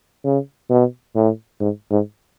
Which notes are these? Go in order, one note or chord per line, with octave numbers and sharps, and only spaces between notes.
C#3
B2
A2
G#2
G#2